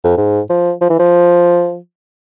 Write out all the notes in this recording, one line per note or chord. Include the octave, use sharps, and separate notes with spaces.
F2
G#2
F3
F3
E3
F3